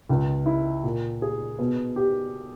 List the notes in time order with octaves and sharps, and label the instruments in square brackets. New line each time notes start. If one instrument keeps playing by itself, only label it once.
[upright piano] C#2
E4
A#2
G#4
B2
G4